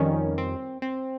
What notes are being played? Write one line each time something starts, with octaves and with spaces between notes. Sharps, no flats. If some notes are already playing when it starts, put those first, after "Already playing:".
Already playing: F2 D#3 G3 C#4
C4
C4